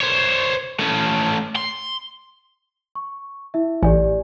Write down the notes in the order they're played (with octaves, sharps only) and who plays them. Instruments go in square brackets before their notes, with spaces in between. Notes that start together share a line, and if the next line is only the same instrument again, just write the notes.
[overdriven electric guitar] C5 C#5
A3 C#4
C6
[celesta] C#6
E4 E5
[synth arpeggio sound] A1 [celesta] G4 D5 G#5